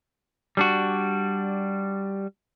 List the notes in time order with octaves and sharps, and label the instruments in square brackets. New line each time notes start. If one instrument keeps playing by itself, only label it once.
[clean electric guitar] G3 D4 F#4